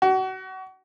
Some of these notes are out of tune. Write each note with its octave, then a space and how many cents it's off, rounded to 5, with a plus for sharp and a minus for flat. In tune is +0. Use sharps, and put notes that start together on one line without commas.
F#4 +30